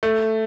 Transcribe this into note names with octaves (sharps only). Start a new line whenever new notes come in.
A3